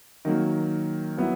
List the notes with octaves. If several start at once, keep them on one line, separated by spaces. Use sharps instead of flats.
D#3 F#3 A#3
F#3 B3 E4